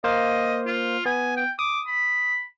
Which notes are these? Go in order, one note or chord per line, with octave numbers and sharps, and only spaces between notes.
A#3 C5 D#5 F5
F4
B3 G#5
G5
D6 D#6
B5